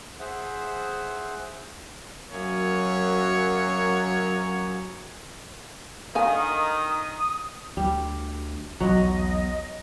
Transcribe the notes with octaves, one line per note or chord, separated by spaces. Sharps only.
G#4 C5 E5 F#5
F#2 F#3 A#3 C#5
D3 D#3 F5 G#5 D#6
D2 G3
B1 E2 F#3 D#5